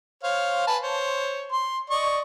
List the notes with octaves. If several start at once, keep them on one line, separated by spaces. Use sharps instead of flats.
C5 C#5 F5
B4 G#5 A5
C5 C#5
C6
D5 D#5 C#6